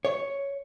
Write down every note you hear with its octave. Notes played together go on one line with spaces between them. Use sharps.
C#5